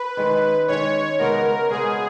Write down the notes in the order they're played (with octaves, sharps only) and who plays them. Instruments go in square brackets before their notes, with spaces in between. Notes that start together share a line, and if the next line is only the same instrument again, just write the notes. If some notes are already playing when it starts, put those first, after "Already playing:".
Already playing: [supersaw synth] B4
[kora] D#3 G#3 C#4
[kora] D#3 G#3 C#4 [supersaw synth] C#5
[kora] C#3 G#3 B3 F#4 [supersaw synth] A#4
[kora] C#3 G#3 B3 F#4 [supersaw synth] G#4